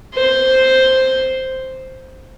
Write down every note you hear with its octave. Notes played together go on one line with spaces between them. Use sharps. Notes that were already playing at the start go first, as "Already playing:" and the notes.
C5